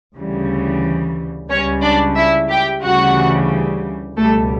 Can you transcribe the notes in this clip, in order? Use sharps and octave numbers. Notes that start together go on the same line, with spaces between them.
D2 C#3 E3 G3
C#2 C#3 G3 C#4 C#5
D4 D5
E4 E5
G4 G5
D2 C#3 E3 G3 F#4 F#5
C#2 B2 G3 A3 A4